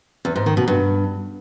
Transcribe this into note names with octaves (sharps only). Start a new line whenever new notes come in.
E2
G#2
D#3
B2
G2